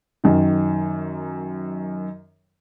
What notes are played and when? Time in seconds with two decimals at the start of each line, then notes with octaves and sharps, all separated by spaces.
0.24 F#2 D#3